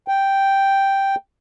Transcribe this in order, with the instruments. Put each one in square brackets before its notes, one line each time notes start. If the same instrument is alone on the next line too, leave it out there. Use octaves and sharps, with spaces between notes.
[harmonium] G5